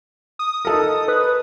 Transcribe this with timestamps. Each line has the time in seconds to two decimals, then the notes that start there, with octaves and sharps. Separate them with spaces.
0.39 D#6
0.65 D#4 A4 A#4
1.08 B4